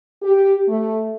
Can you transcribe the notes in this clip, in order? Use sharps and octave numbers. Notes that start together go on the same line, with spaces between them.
G4
A3